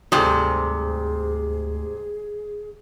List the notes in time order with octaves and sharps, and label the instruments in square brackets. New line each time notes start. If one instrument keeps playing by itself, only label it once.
[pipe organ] D2 [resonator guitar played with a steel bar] G#2 C3 [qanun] G3 A4 [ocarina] G#4